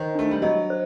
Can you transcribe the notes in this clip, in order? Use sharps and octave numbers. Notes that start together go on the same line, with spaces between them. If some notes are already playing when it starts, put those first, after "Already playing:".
Already playing: D#3 C5
A3 D4
G3
F#3 D#5
C5